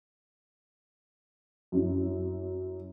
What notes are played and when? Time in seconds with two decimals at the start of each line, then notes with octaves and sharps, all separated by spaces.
1.72 F#2 E4